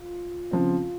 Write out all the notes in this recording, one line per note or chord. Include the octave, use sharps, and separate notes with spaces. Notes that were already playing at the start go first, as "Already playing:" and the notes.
Already playing: F4
C#3 F3 C4